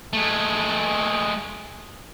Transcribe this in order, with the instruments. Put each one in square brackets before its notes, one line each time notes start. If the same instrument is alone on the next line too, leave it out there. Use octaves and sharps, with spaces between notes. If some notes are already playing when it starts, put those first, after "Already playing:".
[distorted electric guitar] G#3 A3